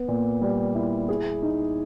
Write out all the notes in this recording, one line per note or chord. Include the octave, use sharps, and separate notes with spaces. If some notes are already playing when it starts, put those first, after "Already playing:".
Already playing: B3
A#2
G3
E4
G#4
D#4